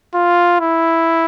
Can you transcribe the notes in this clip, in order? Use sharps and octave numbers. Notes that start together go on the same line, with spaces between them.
F4
E4